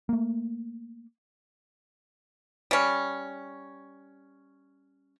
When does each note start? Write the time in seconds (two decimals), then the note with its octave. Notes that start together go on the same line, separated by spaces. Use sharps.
0.09 A3 A#3
2.71 G3 C#4